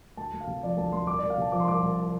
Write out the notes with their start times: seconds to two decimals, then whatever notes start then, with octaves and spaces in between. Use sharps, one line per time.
0.17 D2 A5
0.33 D2
0.41 F5
0.47 C3
0.63 F3 D5
0.77 D2 A5
0.92 D2 C6
1.07 C2 D6
1.18 C2 D5
1.30 F5
1.38 C3 A5
1.52 F3 D6
1.60 C6
1.68 C2 D6
1.82 C2